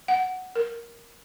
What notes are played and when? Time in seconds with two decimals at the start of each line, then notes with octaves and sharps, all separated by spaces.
0.08 F#5
0.56 A#4